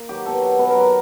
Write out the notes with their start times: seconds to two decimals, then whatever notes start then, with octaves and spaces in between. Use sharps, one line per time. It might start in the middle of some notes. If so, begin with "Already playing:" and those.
Already playing: A#3
0.09 D#3 F#3 G4
0.26 B2 A4
0.42 F#3
0.59 B2 B4
0.70 A#4
0.76 F#3
0.81 A#4